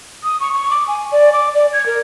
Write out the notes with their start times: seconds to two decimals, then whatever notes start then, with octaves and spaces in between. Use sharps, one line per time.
0.23 D#6
0.40 C#6
0.54 C#6
0.70 D6
0.88 G#5
1.12 D5
1.33 D6
1.54 D5
1.73 G#6
1.86 A#4